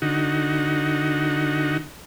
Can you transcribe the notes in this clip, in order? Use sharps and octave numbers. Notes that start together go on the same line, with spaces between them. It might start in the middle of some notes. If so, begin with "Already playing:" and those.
D3 D#4 F#4